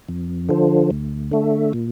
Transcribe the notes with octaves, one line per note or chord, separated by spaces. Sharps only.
F2
D3 F3
D2
D3 A3
A#2